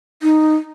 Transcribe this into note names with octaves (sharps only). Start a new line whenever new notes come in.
D#4